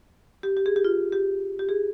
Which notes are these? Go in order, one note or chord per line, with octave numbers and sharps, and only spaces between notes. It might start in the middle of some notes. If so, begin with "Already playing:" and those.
G4
G4
G#4
G4
F4
G4
G4
G#4